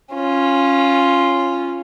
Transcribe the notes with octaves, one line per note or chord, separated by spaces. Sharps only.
C#4 F4